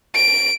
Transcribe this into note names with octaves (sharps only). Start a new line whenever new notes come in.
D7